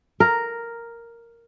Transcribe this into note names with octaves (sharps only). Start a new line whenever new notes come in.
A#4